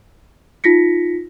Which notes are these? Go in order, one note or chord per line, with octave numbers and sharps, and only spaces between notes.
D#4 F4 A#6 B6 C#7